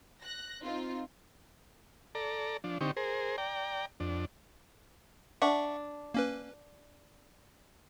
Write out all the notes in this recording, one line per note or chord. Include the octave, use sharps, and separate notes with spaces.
F#6 A#6
C4 D#4 F4
A4 D5 A#5
F3 D4
D3 C4 D#4 G4 C#6
G#4 A#4 C5
D5 G5 A#5
F2 D4
D4 E5 F#5 C#6
A#3 C#4 B4